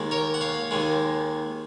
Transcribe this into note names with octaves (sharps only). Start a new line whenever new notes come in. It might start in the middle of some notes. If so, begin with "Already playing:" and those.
Already playing: D#2 D#3 G#3
A#4 C#5
F#5
C#5 F5
D#2 D#3 G#3